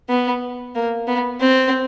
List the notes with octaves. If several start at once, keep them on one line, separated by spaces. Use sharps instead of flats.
B3
A#3
B3
C4